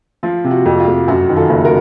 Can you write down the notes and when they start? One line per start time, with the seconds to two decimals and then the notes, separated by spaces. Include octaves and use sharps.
0.23 F3 F4
0.44 C3
0.51 F#4
0.65 F2
0.80 F4
0.87 F2
1.08 F#2 F#4
1.29 D#3
1.37 F4 A4
1.50 F#1
1.65 F#4 A#4